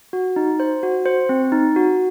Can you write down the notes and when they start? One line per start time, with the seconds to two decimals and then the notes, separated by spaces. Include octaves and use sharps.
0.13 F#4
0.36 D#4
0.60 C5
0.83 F#4
1.06 C5
1.29 C4
1.52 D#4
1.76 F#4